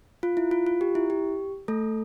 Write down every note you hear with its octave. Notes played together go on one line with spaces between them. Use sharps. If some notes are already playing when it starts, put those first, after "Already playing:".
F4
E4
F4
F4
G4
E4
G4
A3 A4